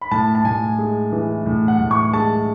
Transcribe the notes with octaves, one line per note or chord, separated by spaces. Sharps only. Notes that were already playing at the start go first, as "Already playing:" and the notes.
B5
A2 A5
A5
A2 G#5
G#3
E3
A2
F#5
A2
C#6
G#3 A5